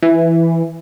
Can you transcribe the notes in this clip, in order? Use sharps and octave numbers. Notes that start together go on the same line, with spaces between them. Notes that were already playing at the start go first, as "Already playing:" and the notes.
E3